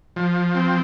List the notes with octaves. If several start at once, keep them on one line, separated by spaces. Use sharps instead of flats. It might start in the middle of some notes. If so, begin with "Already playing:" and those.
F3
C4